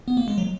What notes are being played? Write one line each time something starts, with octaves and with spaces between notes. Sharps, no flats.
B3
A#3
G#3
F#3